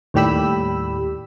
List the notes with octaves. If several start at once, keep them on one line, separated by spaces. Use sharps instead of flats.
D#2 A2 G3 G4 B5 E6